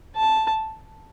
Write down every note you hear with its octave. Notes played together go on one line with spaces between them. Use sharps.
A5